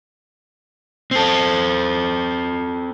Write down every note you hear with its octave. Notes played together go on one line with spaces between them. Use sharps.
C4 A4